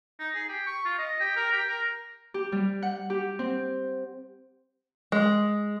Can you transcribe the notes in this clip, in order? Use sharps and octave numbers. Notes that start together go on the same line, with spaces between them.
D#4
G#4
G4
C#6
F4
D#5
G4
A#4
G4
A#4
G4
G3
F#5
G4
C4
G#3